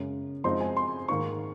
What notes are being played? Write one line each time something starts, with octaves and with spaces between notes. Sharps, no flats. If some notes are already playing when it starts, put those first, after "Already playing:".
Already playing: F#2 C#3 G#3 C#4
F#2 F3 G#3 C4 D#4 C6
G#5
C6
G#2 D#3 A#3 C#6